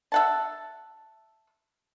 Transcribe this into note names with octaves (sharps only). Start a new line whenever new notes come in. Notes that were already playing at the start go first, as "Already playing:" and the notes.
E5 F#5 A5